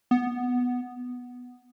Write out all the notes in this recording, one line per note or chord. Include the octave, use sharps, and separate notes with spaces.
B3